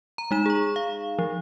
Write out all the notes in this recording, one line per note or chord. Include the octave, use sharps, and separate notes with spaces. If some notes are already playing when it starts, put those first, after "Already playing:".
A#5
G#3 D#4 E7
G#4 C#6
F5
F3